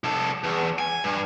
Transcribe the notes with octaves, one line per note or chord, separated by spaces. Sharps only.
C2 A4
E2
G#5
G2